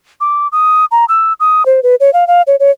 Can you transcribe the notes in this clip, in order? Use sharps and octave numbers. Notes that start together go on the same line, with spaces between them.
D6
D#6
A#5
E6
D#6
C5
B4
C#5
F5
F5
C#5
C#5